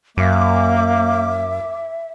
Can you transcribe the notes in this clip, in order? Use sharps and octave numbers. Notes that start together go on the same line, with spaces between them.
F#2 A#3 E5 D6